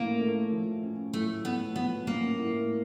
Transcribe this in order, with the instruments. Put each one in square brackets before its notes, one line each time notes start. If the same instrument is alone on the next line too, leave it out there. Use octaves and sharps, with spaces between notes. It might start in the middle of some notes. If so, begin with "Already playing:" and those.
Already playing: [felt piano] A2 F3 C#4 [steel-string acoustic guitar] A#3
[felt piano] A3
F3
C#4
[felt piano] A2 [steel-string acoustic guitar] A3
[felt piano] A3 [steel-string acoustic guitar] B3
[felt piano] F3 [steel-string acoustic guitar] B3
[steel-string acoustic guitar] A#3 [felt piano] C#4
[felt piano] A2